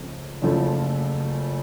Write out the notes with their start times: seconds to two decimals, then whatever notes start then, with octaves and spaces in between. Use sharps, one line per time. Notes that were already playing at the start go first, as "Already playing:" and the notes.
Already playing: C#2 C#3 F3 A3 C4
0.42 F#1 F#2 C#3 F3 A3